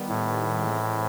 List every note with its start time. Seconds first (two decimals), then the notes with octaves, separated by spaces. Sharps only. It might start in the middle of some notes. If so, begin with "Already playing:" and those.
Already playing: D#3 G3 B3
0.08 A2
0.60 E3 G#3 C4